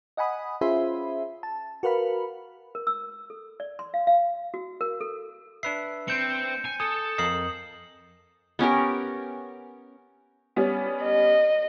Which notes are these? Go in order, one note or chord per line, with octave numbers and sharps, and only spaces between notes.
D#5 F#5 G#5 B5 D#6
C#4 F4 G#4 C5 E5 B5
A5
F#4 A#4 B4 F5 B5
A#4
E6
A4
D5
C6
F5
F5
F#4
A#4
A4
D4 B4 E5 C7
C4 G6 C#7
G#5
A4 G#5 D#6
F2 A#4 D#5 D#6 C7 F#7
B3 C#4 G4 A#4
G3 B3 C#4
D#5